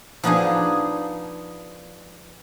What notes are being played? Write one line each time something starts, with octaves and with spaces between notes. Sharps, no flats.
F3 B3 D4 D#4 G#4